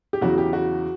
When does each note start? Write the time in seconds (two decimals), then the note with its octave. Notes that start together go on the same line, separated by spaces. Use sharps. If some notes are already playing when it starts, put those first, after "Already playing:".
0.13 G4
0.21 E2 C#3 F#3 F#4
0.38 G4
0.53 F#4